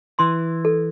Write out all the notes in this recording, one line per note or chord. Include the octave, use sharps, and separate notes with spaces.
E3 C6
A4